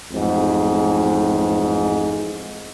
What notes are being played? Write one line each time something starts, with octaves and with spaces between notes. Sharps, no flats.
A1 F2 G#2